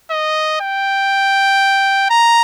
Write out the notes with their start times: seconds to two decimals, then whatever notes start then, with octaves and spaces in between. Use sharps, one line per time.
0.11 D#5
0.61 G5
2.10 A#5